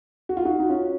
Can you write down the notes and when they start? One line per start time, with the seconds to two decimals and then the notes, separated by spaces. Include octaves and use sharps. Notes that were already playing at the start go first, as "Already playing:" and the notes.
0.29 F#4
0.37 F4
0.45 D#4 F#4
0.60 D#4
0.69 C#4 F4